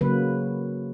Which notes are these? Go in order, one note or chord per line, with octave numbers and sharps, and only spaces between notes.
C#3 F#3 A#3 B4